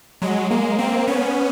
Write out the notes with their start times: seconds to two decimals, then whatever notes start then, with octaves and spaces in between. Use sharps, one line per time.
0.22 F#3 G#3
0.51 G#3 A#3
0.79 A#3 C4
1.07 B3 C#4